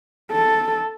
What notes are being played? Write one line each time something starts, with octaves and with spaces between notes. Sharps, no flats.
A4